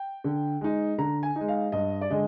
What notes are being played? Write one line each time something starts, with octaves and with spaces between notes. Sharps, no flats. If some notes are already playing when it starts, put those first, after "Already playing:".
Already playing: G5
D3
G#3 D#4
D3 A#5
G#5
G#3 D#4
F5
G2 D#5
D5
D3 G#3 D#5